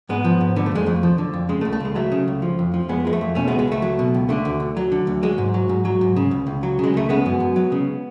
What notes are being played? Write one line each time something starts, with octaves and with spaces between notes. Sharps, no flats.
G#2 G#3 B3
F3
G#2
D3 B3
A3
F2 G#3
F2 A3
F3
D3
F2
C#3 G#3
A3
C#2
A3
C#2 G#3
F#3 A3
C#3
C#2
F3
F2
F3
F2 G#3 B3
F3 G#3
A3
F2
B2 A3 C#4
C#2 G#3 B3
G#3
C#2 A3
F#3
B2
C#2
D3 A3
D2
D2
F#3
D3
D2
F#3 G#3
G#2
F#3
G#2
F#3
G#2
C#3
C#2
C#2
F#3
C#3 G#3
C#2 A3
C#3 G#3 B3
F#2
F#2
F#3
C#3